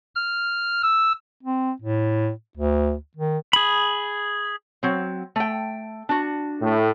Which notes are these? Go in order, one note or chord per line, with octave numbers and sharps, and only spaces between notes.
F6
E6
C4
A2
D2
D#3
G#4 B5
F#3 C4
A3 G5
D4 F#4
A2 A3